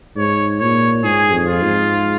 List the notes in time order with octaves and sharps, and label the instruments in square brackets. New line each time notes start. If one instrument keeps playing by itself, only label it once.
[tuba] G#2 [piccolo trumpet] C#5
[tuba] A#2 [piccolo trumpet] C#5
[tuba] G#2 [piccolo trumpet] G#4
[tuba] F2
[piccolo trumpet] F4
[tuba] G#2